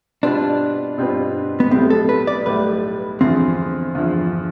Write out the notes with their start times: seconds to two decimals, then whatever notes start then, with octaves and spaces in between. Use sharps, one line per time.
0.23 B2 G3 C4 D4 F4 B4
0.98 B2 G3 C4 F4 B4
1.60 B3
1.71 B1 A2 G3 C4
1.90 A4
2.09 B4
2.27 D5
2.46 B1 A2 G3 B4
3.21 E2 D3 F3 C4
3.95 E2 D3 F3